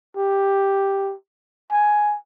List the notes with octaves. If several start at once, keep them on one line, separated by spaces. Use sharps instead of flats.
G4
G#5